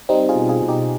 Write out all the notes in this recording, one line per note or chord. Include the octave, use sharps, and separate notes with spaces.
G3 C4 D#4
F4 G#4
B2
F4 G#4
B2
D#4 G4